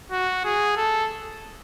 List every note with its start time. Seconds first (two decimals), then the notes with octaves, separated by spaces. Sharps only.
0.11 F#4
0.44 G#4
0.77 A4